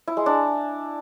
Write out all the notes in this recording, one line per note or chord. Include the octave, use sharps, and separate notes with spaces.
E4
G#3
D4